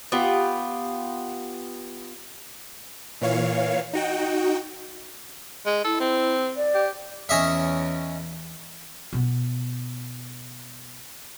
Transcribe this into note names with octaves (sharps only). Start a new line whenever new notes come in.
B3 F4 G4
A#2 E3 C#5 F5
D#4 F#4 G5
G#3
E4 A4
C4
D5
G4
E2 C#4 D#5 E5
B2 B3